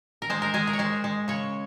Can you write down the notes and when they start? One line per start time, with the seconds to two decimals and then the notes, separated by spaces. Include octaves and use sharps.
0.22 A#4
0.30 G#3 C5
0.42 A#4
0.54 G#3 G#4
0.67 A#4
0.73 C#5
0.79 G#3 C5
1.04 G#3
1.28 C#3 C#5